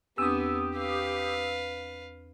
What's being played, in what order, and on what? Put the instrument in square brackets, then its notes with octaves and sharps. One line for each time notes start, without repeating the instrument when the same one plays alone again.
[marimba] E2 C4 D4 [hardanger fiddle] B3 [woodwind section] G4 [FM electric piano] D#6 E6
[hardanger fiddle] B4 F5